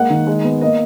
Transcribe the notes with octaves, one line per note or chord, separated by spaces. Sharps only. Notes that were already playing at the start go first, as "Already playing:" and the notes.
Already playing: G#3 A#3 F#5
D#3
G#3
B3
A#3 D#5